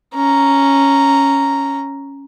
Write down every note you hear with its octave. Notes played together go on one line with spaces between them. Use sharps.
C#4 A#5